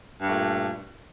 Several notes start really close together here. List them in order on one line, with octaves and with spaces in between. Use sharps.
G2 A3 A#2